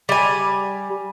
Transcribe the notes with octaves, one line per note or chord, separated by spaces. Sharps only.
G3 G#5